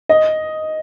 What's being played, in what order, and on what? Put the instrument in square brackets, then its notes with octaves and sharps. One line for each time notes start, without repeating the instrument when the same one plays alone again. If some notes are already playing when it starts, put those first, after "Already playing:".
[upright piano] D#5